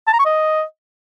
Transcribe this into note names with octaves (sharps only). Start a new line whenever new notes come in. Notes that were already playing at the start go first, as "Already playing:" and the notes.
A5
A#5
C#6
D#5